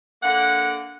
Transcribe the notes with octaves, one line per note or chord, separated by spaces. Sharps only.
D3 A#3 F#5